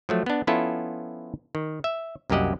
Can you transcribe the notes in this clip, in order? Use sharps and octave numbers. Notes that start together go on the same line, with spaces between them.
F3 F#3 A3
B3 D4
F3 B3 C#4 E4 F4 A4
D#3
E5
C2 F#2 A#3 G4 D#5 F#5